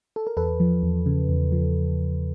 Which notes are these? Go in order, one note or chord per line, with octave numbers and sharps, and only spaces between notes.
A4
A#4
E2 A4 B4
F3
E2
C#3
E2
F3